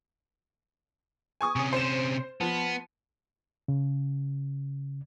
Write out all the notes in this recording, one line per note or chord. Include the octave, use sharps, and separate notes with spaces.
G#5 C#6 D#6
C3 C#4
C5 E7
F3 B3
C#3